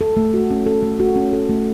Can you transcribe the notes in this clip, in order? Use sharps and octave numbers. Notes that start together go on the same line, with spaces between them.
A4
A3
F#4
C#4
A4
A3
F#4
C#4
A4
A3